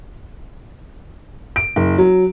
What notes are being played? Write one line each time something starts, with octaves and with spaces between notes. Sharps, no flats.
D7
F#1
F#3